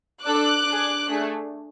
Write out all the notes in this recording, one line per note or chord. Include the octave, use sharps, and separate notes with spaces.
D4 A4 D6 F#6
D4 G#4
A3 D4 G#4